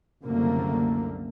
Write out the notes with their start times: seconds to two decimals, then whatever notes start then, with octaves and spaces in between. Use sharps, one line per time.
0.23 F#1 C2 F#2 D3 A3 A#3